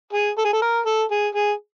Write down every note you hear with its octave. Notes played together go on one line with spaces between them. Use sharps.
G#4
A4
G#4
A4
A#4
A4
G#4
G#4